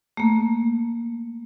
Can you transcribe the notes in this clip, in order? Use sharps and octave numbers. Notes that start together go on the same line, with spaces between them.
A3 A#3